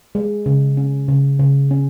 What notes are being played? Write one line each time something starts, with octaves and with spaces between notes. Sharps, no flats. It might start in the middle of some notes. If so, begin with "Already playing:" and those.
G#3
C#3
C#4
C#3
C#3
C#4